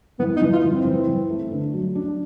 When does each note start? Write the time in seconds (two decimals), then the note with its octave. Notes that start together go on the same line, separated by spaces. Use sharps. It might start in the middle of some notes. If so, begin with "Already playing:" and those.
0.19 E3 B3
0.36 D#4
0.42 E3
0.52 F4
0.64 E3
0.69 C4
0.85 E3
1.07 E3
1.29 A3
1.51 D3
1.73 F#3
1.95 D4